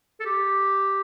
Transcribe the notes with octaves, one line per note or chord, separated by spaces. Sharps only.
A4
G4